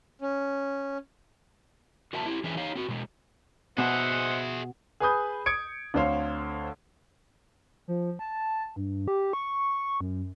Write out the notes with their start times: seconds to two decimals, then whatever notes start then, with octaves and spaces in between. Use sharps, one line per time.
0.21 C#4
2.13 F#4 A#4 E5 A5
2.26 E4 G4
2.44 E3 C#4 D4 G#4 B4 E5
2.57 D#4 G4 C#5 F5
2.76 C4 F#4
2.89 B2 G#3
3.78 B2 G#4 C5 D#5 E5 F#5
5.00 G#4 B4 G#5 B5 D#6 G6
5.46 D#6 G#6 C#7 D7
5.94 D2 D3 C4 C5 C#5 F5
7.88 F3
8.19 A5
8.76 G2
9.08 G4
9.33 C#6
10.01 F#2